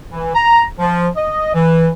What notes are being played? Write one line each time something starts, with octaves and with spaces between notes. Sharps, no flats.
E3
A#5
F3
D#5
E3